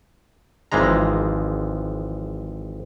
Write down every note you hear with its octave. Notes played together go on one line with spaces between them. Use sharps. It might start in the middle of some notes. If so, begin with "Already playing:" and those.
G#1 E3 F3 G#3 A#5